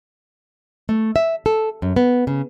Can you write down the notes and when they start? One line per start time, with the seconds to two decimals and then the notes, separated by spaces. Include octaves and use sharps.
0.89 A3
1.16 E5
1.46 A4
1.82 F#2
1.96 B3
2.27 C#3